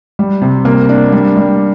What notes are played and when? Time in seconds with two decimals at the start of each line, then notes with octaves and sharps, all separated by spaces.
0.19 G3
0.42 C3
0.65 A#3
0.89 D4
1.12 G3
1.36 G3